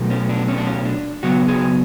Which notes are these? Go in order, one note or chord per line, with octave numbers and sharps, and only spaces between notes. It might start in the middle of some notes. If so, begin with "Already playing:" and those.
Already playing: B2 F#3 A3
C#4
D4
C#4
D4
C#4
D4
C#3 F#3 B3 F#4
G#4